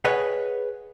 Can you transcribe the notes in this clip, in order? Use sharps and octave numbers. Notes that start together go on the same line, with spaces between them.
G#4 B4 C#5 D#5 F#5 G#5